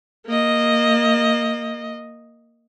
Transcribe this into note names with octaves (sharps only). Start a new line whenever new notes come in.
A#3 D#5